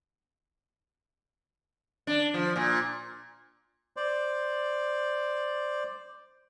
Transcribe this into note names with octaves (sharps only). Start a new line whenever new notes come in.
D4
F3
A#2
C5 D5